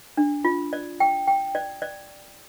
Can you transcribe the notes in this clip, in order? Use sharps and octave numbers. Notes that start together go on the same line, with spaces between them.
D4
F4
D5
G5
G5
D5
D5